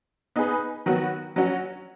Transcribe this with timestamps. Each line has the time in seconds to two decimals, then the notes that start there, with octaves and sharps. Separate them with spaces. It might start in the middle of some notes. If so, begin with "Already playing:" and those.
0.36 B3 D#4 G#4 B4
0.86 D#3 F#3 B3 F#4
1.36 F#3 C#4 F#4